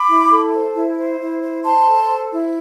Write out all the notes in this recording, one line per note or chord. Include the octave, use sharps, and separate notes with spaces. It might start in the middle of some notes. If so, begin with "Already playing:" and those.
Already playing: B5 D6
E4
A4
C5
E4
C5
E4
C5
C5 A5 C6
A4
C5
E4